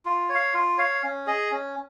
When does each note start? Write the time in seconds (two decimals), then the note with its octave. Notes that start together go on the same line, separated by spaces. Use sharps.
0.05 F4
0.29 C#5
0.35 F5
0.54 F4
0.78 C#5 F5
1.03 C#4
1.27 G#4 D#5
1.51 C#4